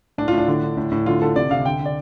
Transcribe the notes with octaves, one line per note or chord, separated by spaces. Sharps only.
A2 D4
F4
A2 D4
D3
D3
A2
A2
D3 F4
D3 A4
C3 D5
C3 F5
D3 G5
D3
D5